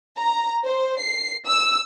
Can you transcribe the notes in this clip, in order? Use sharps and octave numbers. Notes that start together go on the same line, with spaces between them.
A#5
C5
C7
E6